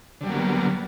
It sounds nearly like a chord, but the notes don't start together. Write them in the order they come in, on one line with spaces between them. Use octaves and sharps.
D3 G3 F#3 A#3 B3